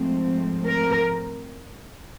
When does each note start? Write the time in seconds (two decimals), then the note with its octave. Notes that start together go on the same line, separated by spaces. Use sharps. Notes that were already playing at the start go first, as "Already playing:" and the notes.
Already playing: G#2 F3 A3 C4
0.69 A#4